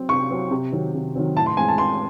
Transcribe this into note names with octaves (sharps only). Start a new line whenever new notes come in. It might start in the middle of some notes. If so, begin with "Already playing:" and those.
Already playing: F#3 C4
C3 C#6
F#3 C4
C3
D#3 F#3 C4
C3
D#3 F#3 C4
A2 A5
C6
E3 G#3 C4 G#5
A5
A2 C6